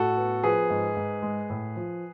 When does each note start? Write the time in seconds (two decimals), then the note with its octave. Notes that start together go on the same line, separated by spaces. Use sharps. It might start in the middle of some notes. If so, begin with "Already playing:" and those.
Already playing: A2 F#4 A4
0.17 B3
0.44 F3 G#4 B4
0.70 G#2
0.97 G#2
1.22 G#3
1.50 A2
1.76 F3